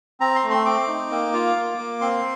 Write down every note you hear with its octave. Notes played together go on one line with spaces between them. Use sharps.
C4 A#5
C6
A3
C6
C4 D6
D#4
A#3
F4
A#3
A#3
C4 C6